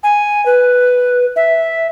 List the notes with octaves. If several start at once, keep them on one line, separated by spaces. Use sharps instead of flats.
G#5
B4
E5